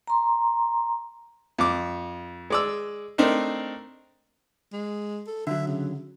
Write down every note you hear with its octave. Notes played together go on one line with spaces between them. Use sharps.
A#5 C6
F2 D6
G#3 D5 E6
A3 C4 D4 D#4 A#4
G#3
A4
D3 F#3 E5
C#3